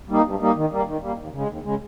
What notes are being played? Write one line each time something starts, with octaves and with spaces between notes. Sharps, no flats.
G3 A#3 D#4
G2
G3 A#3 D#4
D#3
G3 A#3
D#3
G3 A#3
D#2
C#3 G#3
D#2
C#3 G#3